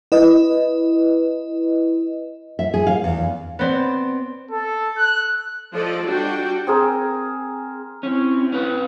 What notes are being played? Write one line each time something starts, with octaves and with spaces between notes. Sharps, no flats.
E4 B4 D#5
E5
G#4
F5
E2
B3 C4 D5
A4
F#6
F3 F4 A4 D5 D#5
G3 D4 F#4 G5
C4 G#4 A#4
C4 C#4 E4
C#4 B4